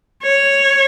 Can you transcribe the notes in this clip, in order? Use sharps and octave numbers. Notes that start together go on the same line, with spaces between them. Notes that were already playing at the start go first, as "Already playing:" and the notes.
C#5